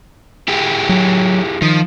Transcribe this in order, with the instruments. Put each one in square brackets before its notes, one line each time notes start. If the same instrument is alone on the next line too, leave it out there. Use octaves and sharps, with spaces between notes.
[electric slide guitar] E4 G4 G#4
[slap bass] F#3
[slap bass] D#3 [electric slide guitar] F3